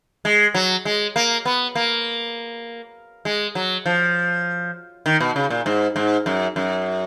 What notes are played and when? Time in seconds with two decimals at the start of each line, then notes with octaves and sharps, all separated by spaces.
0.25 G#3
0.54 F#3
0.85 G#3
1.16 A#3
1.45 B3
1.75 A#3
3.25 G#3
3.55 F#3
3.86 F3
5.06 D#3
5.20 B2
5.36 C#3
5.50 A#2
5.66 G#2
5.96 G#2
6.26 F#2
6.56 F#2